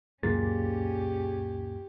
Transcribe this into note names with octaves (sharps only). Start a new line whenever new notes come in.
C#2 F#2 A#2 C#4 G4 G#4 A6